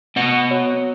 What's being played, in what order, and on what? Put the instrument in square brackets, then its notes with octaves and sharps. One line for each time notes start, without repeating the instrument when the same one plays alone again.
[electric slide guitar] B3 D#5 F#5
[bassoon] F#3